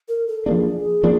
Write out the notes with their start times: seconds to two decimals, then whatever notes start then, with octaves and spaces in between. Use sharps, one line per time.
0.08 A#4
0.28 A4
0.46 F3 A#3 D4 G#4
1.03 F3 A#3 D4